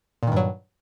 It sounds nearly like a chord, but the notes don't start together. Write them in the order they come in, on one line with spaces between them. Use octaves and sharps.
A#2 D#3 G2 F#3